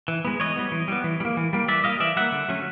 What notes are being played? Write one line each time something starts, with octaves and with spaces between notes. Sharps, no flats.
E3
G#3 B3
E3 C#5 D#5
G3 B3
E3
G3 B3
E3
G3
A#3
E3
G3 A#3
E3 D5 E5
G3 A#3 D#5 F5
E3 D5 E5
G3 A#3 E5 F#5
D3
F#3 A3 C#4